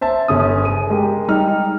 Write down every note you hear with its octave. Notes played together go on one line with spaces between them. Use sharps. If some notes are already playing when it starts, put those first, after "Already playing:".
C5 E5 A5
G1 C#3 C#4 D#6
G#4 D#7
G#3 G4 A#4
G3 D#4 F6